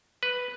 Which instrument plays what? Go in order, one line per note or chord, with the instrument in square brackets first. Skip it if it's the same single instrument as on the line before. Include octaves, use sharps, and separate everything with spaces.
[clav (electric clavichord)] B4